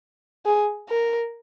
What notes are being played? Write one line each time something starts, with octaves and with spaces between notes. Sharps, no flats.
G#4
A#4